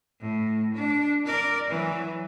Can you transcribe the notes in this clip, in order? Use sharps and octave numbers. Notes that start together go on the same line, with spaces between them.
A2
D4
A#4 D5
E3 F#3